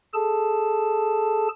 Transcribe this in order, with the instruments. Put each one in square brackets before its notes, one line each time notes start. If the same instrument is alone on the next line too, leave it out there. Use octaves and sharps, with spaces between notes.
[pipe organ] G#4 A4 A5